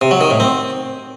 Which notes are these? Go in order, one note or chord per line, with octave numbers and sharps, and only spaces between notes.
C3
F#3
D#3
A2
C4